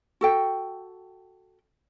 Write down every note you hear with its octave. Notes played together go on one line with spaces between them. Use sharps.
F#4 A4 G5